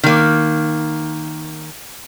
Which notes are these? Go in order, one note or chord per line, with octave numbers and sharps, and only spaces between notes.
D#3 A#3